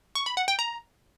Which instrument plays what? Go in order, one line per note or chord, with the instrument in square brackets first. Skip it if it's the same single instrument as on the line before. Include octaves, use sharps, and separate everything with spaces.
[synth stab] C#6
B5
F#5
G5
A#5